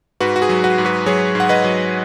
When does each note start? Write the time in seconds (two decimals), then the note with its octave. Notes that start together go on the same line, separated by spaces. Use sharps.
0.20 G#2 F#4 B4
0.36 F#4
0.42 G#4
0.49 F#3
0.64 F#4 B4
0.78 G#2
0.85 F#4 B4
1.06 F#3 G#4 C#5
1.35 G#2 F#5
1.49 B4 D#5
1.64 F#3